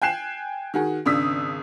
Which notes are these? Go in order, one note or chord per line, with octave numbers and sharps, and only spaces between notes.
G5 G#5 F#6 C7 E7
D#3 F#4 G#4
G#1 C#3 D4 D#6 E6 B6